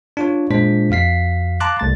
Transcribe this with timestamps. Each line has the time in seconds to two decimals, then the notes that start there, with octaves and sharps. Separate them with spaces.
0.17 D4 F4 C#5
0.50 A#2 G#3 D4 F4 C5 B6
0.90 F2 F#4 F5 B6 C7
1.60 F5 A5 A#5 C6 D6 F#6
1.80 C2 A3 A6